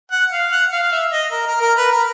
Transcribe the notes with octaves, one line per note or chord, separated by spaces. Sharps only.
F#5
F5
F#5
F5
F5
E5
D#5
A#4
A#4
A#4
B4
A#4